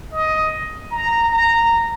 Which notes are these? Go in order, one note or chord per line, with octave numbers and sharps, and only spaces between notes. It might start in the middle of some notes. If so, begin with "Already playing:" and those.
D#5
A#5
A#5